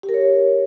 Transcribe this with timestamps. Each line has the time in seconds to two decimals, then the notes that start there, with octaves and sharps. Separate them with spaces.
0.03 G4
0.09 A#4
0.14 C#5